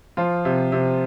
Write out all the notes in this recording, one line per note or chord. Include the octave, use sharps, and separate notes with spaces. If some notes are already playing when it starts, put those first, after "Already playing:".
F3 F4
C3
C3